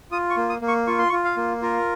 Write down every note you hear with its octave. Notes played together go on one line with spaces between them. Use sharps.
F4 D#6
C#6
A#3
D#6
A#3
C#6
F4 C#6
C6
C#6
F4
F5
A#3
F4 A#4